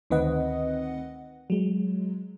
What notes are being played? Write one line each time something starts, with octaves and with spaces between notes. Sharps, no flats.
D2 D#3 C4 B4 D#5 F#5
F#3 G#3